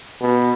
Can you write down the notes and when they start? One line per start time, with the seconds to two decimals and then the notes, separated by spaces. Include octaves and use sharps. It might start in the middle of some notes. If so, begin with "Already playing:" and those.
0.21 B2